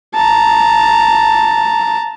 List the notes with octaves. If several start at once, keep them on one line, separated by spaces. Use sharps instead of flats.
A5 A#5